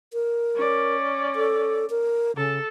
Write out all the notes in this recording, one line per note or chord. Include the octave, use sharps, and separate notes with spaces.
A#4
C#4 D5
A4
A#4
C#3 A4